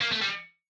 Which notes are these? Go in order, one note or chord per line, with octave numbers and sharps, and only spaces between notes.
A#3
A3
G3